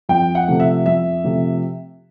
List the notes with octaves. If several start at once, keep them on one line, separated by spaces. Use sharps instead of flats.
F2 G5
F#5
C3 F3 A3
E5
F2 E5
C3 F3 A3